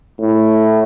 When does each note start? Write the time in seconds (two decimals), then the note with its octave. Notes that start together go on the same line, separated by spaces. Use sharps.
0.20 A2